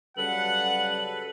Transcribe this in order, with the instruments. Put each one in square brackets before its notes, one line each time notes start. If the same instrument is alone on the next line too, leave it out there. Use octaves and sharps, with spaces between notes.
[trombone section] C#3 F#3 G3 [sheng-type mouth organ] A4 B4 [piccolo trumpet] F#5 [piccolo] F#7